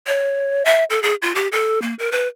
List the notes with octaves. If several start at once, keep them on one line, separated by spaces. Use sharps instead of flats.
C#5
E5
A4
G#4
F4
G4
A4
A#3
A#4
B4